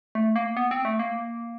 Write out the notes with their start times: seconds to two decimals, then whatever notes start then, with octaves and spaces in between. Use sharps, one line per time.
0.15 A3
0.36 A#3
0.57 B3
0.71 C4
0.85 A3
0.99 A#3